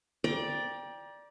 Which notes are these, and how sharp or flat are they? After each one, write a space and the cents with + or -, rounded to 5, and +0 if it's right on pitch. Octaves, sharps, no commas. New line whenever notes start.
D5 +0 G5 +15 A#5 +35